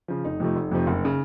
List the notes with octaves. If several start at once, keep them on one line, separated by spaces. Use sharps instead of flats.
C#3 F3
F1 D#4
F2 C3 F3 A3
F1
F2 C3 F3 A3
F#1
C#3